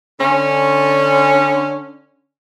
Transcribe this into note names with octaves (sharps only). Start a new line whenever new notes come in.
D3 C#4